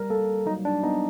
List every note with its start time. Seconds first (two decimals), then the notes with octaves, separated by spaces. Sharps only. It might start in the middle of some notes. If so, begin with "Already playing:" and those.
Already playing: G3 A#4
0.10 A#3 A4
0.46 F#3 D#4
0.65 D4
0.83 B3 D#4